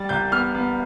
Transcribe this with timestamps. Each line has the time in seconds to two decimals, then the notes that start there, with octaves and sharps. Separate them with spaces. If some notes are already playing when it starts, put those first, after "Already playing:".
Already playing: G3 A6
0.09 C2 G6
0.32 B3 F6
0.54 B3